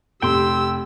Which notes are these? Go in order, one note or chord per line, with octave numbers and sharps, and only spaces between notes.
F1 G4 G5 C6 E6